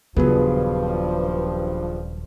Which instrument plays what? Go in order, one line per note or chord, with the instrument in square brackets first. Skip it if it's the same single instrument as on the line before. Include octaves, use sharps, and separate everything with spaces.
[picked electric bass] D#1 F#3 [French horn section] G2 F3 [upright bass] C#3 [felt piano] B3 G#4 B4